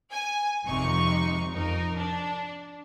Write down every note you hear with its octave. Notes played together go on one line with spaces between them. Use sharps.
G#5
G#1 F2 C3 D#4 C#6
F2 D#4 A#4
D4